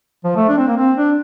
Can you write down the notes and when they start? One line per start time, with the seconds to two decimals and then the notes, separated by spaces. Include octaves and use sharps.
0.24 F3
0.36 A3
0.49 D4
0.58 C4
0.68 A#3
0.77 C4
0.98 D4